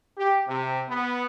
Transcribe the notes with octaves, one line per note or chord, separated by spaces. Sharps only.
G4
C3
B3